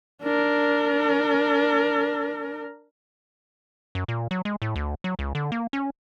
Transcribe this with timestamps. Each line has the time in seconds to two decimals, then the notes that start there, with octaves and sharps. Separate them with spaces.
0.23 D4 A#4
3.95 F#2
4.08 A#2
4.31 F#3
4.45 G#3
4.62 A2
4.76 D2
5.04 F#3
5.19 C#2
5.35 D3
5.52 A#3
5.73 C#4